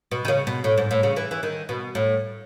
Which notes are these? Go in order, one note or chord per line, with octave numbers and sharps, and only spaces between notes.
B2
D#3
C#3
B2
A2
G#2
A2
C#3
E3
E3
D#3
B2
A2